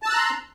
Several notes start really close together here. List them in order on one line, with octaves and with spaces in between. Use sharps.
A5 E6 F#6 A#5 C6